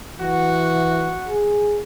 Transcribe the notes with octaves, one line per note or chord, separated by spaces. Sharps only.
E3 F#4
G#4